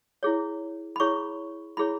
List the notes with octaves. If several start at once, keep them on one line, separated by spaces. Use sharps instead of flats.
E4 G#4 C#5
B5
E4 G#4 C#5 C#6
E4 G#4 C#5 B5